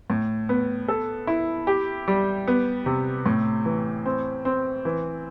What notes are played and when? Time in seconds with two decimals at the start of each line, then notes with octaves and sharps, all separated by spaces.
0.10 A2
0.49 B3
0.88 A4
1.27 E4
1.67 G4
2.08 G3
2.47 B3
2.86 C3
3.26 A2
3.65 E3
4.06 C4
4.45 C4
4.85 E3